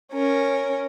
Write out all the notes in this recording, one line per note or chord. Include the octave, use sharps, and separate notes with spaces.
C#4 A#4